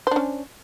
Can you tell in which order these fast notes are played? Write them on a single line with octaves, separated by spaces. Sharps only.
C5 D4 C#4